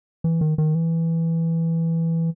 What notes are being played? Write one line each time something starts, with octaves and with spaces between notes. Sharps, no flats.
E3
D#3
D#3
E3